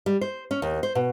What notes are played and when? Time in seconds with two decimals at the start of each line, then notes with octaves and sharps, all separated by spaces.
0.06 G3
0.21 C5
0.51 C#4
0.62 D#2
0.83 C5
0.95 B2